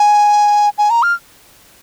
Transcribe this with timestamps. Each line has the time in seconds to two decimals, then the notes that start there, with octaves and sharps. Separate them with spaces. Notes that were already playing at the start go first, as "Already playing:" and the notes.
Already playing: G#5
0.78 G#5
0.90 A#5
1.03 F6